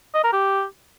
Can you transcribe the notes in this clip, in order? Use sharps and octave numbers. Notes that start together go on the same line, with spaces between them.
D#5
A#4
G4